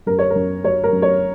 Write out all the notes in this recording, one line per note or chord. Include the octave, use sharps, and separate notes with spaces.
F#2 A#4
C#5
A#4
F#2
F#3 C#5
A#4
F#2
C#5